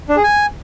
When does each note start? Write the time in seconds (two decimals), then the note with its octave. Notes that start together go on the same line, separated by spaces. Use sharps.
0.09 D4
0.16 G#4
0.24 G#5